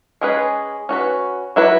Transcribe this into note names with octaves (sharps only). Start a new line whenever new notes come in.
G#3 C#4 G#4 B4
C#4 F#4 B4
F#3 E4 B4